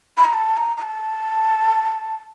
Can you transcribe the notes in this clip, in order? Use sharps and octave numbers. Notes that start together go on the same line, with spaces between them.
B5
A#5
A5
A#5
A#5
A5